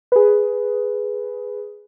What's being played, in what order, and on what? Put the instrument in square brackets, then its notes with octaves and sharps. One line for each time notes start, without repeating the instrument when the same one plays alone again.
[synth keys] G#4 B4